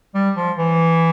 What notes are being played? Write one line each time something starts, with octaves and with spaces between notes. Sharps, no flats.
G3
F3
E3